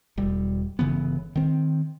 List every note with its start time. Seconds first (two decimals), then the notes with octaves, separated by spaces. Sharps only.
0.17 E1 G3
0.79 G1 C#3 E3 B3
1.36 D#3 C4